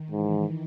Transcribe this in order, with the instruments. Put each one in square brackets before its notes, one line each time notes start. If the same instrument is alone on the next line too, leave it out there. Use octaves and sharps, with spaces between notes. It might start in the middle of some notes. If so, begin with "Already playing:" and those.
Already playing: [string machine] D#3
[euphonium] G#2 [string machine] E3